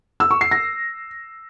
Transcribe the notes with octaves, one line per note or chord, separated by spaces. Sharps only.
E6
C#6
C7
A#6